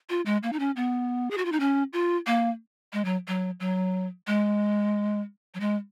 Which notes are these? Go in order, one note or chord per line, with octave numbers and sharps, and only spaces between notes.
F4
G#3
A#3
D#4
C#4
B3
G#4
F#4
F4
D#4
C#4
F4
A#3
G#3
F#3
F#3
F#3
G#3
F#3
G#3